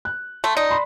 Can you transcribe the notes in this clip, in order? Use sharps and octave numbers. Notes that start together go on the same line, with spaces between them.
F#6
A3 C6
D#4 D5
B5 C6